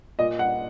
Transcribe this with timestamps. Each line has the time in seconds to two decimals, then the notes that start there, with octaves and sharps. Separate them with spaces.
0.19 A#2 D#5
0.39 F#5